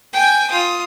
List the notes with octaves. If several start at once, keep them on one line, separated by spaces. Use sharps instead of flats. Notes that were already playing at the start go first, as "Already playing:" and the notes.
G5 G#5
F4 D#6